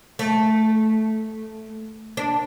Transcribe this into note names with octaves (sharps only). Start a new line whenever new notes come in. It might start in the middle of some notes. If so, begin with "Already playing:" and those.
A3
D4